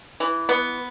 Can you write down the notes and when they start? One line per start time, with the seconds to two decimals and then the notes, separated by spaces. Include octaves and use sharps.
0.20 E3
0.49 B3